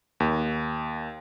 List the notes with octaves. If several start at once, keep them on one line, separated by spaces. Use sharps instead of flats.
D#2